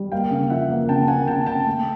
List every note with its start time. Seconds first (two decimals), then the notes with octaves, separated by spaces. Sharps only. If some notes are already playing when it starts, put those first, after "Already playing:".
Already playing: G3
0.12 A#3 F5 G5
0.31 C#3
0.50 F3 E5 F#5
0.70 A#3
0.89 C#3 G5 A5
1.08 A#3 F#5 G#5
1.27 C#3 G5 A5
1.46 C#3 G5 A5
1.66 A3